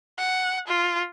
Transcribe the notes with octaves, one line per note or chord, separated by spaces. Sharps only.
F#5
F4